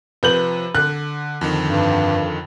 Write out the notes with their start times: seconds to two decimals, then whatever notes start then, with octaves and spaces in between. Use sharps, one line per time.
0.23 C3 F3 B4 G6 F#7
0.75 D3 F#6
1.41 F2 D3 D#3
1.70 G2